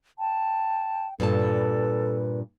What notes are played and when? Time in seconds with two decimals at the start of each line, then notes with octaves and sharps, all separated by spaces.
0.19 G5 A5
1.20 G2 A#2 A4 B4 A5